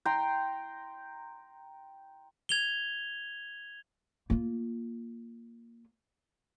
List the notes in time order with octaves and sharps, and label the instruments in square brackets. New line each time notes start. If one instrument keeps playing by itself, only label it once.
[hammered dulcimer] G5 A#5 C6
[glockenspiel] G#6 F7 G7
[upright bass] A#3 F4